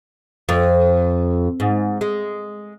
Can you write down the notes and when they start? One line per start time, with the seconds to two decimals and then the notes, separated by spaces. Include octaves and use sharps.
0.49 F2
1.60 G#2
2.01 G#3